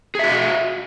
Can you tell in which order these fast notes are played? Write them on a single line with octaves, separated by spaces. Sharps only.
G#4 E5 F#4